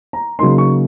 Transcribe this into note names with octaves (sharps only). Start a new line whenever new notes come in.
A#5
C#3 F#3 A#3 D#4 C6
C#6